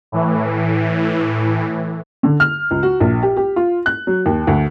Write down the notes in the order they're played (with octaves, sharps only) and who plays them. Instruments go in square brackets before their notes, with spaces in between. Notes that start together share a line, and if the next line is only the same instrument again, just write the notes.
[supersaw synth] A2 E3
[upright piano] D3
F6
C#2
F#4
A#1
G4
G4
F4
F#6
F#3
D#2
D2